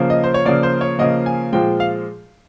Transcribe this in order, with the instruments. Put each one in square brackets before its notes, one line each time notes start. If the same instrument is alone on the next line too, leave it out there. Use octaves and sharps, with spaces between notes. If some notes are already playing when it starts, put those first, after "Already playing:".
Already playing: [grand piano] C#3 F3 A#3
D#5
C5
C#5
C#3 F3 A#3 D5
C5
C#5
C#3 F3 A#3 D#5
G#5
A#2 F3 G#3 G5
F5